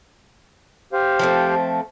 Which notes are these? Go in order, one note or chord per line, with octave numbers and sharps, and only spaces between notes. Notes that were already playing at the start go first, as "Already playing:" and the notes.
G4 C5 F5
F3 A3 C4